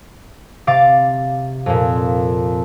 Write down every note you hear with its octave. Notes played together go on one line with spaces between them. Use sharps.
C3 F5 D6 A6
F2 A#2